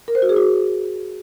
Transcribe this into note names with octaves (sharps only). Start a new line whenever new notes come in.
A#4
C5
F#4
G#4
F#4